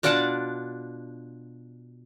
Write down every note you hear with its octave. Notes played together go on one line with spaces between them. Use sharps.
B2 D4 F4 D5 F#5 A5